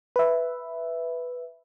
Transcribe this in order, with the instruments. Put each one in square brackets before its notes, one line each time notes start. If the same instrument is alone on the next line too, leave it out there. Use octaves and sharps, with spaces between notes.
[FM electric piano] B4 E5